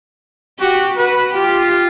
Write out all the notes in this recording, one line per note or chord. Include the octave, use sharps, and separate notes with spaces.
F#4 G4
F#4 B4
F4 G4